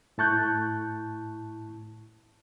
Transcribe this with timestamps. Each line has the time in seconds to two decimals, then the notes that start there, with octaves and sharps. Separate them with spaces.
0.18 A2 E4 A5 C#6 F#6 G6